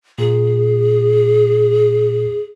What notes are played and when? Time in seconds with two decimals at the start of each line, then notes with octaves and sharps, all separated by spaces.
0.18 A#2 G#4